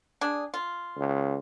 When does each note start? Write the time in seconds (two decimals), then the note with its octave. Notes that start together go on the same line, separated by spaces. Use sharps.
0.21 D4 G#4
0.54 F4
0.98 C#2